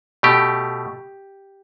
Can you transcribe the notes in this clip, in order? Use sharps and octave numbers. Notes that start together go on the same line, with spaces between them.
B2 A3 G4